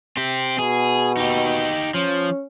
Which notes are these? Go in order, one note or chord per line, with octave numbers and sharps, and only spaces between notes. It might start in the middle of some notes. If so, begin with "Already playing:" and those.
C4 G4
B2 G#4
D#4 G4
F3 C#4